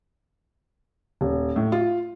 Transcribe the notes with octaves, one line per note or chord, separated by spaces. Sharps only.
D#1
A2
F4